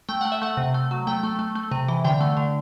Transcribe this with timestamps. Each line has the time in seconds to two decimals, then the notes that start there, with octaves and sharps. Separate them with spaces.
0.09 A3 G5
0.21 A3 F#5
0.32 E5
0.42 A3 F#5
0.57 C3
0.74 A3
0.91 F#3
1.07 A3 G5
1.23 A3
1.39 A3
1.55 A3
1.71 C3
1.88 E3
2.05 D3 G5
2.21 A3
2.37 D3